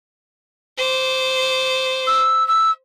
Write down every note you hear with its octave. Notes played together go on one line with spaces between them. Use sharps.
C5 D6
E6
E6